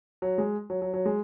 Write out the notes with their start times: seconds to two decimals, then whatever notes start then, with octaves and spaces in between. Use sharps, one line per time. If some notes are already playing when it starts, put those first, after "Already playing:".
0.22 F#3
0.38 G#3
0.70 F#3
0.82 F#3
0.94 F#3
1.06 G#3